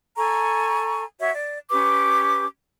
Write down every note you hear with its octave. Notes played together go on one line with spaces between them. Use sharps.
A4 G#5 A#5 C#6
F#4 C#5 E5
D5
C#4 G4 B4 D6